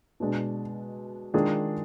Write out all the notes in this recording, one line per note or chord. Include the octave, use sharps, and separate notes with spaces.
B2 G#3 D4
D#3 G#3 D4 F4 G#4